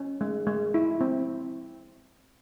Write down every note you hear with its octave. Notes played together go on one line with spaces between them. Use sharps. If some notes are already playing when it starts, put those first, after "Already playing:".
Already playing: C#4
G#3
G#3
E4
C4